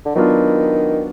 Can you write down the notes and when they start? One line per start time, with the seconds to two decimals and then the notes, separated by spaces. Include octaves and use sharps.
0.05 D3
0.15 D#3 F#3 B3 D4 F4